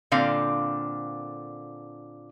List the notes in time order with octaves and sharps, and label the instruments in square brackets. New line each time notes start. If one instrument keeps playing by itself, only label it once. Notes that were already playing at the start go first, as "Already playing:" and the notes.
[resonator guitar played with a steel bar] A#2 D3 C4 F5